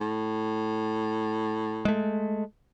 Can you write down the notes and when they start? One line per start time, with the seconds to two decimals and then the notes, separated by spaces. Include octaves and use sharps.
0.01 A2
1.85 G#3 A3